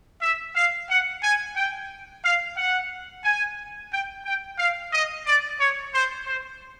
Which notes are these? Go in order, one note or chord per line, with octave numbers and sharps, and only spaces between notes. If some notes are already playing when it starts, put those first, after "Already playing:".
E5
F5
F#5
G#5
G5
F5
F#5
G#5
G5
G5
F5
D#5
D5
C#5
C5
C5